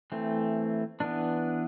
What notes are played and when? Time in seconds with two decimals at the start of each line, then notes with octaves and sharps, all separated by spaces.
0.12 E3 A3 C4
1.00 E3 B3 D4